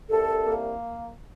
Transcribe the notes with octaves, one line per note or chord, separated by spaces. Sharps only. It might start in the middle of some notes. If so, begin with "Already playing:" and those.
C2 A4
A#3